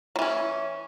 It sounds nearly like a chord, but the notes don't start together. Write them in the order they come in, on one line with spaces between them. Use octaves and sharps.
F#3 E3 C#4